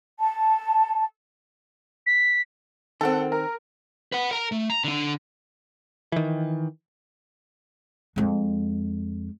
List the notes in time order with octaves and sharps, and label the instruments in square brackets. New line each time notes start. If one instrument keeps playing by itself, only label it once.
[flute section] A5
[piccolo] B6
[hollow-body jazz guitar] D#3 C4 [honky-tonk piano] A4 F#5
[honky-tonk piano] A#4
[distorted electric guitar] B4 F#5
A#4 A#5
A3
A#5
D3 D4
[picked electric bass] D#3 E3
[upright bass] F2 G#3